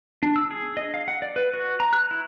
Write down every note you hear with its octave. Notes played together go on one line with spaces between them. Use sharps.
D4
E6
G#4
D#5
F5
F#5
D5
B4
F#4
A#5
F#6
E4